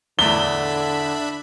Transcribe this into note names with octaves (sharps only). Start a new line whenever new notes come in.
E2 A2 D3 D4 E5 B5 G7